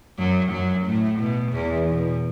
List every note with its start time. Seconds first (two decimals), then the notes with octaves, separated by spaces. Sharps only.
0.19 F#2 F#3
0.51 F#2 F#3
0.86 A2 A3
1.20 B2
1.53 E2 E3
1.88 B2